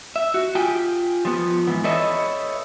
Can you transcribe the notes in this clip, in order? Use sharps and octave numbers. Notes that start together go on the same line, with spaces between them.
E5
F#4
F4 G4 G5 G#5
F3 B3
G#2 E3 B3
A4 B4 C#5 D#5 E5